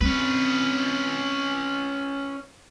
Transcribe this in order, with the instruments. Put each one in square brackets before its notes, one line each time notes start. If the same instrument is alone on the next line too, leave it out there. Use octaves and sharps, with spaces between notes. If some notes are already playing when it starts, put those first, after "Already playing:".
[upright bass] C4 [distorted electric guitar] C#4 B4